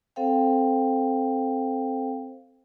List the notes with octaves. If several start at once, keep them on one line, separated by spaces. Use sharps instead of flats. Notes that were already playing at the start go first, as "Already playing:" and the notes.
C4 A4 C5 F5 G5